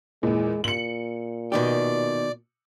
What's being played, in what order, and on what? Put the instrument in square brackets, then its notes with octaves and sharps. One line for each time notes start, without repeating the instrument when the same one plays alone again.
[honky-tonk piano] E2 A#2 [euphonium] G#3
[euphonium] A#2 [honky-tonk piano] C#7 F#7
[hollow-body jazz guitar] B2 D#3 G4 [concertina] D5